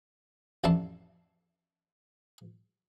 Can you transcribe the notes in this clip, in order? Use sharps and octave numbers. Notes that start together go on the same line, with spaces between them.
A1 F2 D4 E4 A5 C6